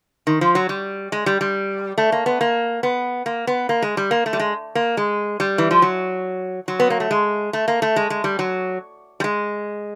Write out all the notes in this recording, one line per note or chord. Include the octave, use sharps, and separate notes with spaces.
D#3
F3
F#3
G3
G#3
G3
G3
A3
A#3
B3
A#3
B3
A#3
B3
A#3
G#3
G3
A#3
A3
G3
G#3
A#3
G#3
G3
E3
F3
F#3
F#3
B3
A#3
A3
G#3
A3
A#3
A3
G#3
G#3
G3
F#3
G3
G#3